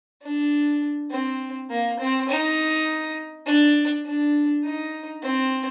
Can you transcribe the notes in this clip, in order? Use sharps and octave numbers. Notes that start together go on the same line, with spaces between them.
D4
C4
A#3
C4
D#4
D4
D4
D#4
C4